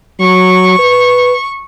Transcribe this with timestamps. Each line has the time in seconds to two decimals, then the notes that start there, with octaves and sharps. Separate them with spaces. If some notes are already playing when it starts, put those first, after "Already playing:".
0.20 F#3 C#6
0.79 B4